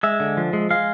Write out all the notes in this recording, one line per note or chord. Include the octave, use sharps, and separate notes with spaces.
G#3 E5
D3
F3
G#3
G#3 F5